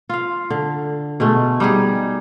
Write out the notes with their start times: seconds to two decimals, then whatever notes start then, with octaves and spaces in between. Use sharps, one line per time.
0.09 F4 F5
0.50 D3
1.20 B2 G#3 A3
1.60 G3 D#4 G4 G#4